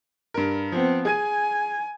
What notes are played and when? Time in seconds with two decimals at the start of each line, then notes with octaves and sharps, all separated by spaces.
0.34 G2 A#4
0.72 F3 B3 C4
1.05 G#4 G#5 G#6 D#7